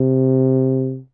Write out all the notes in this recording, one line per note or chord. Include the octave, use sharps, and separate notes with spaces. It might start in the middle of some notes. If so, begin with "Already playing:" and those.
Already playing: C3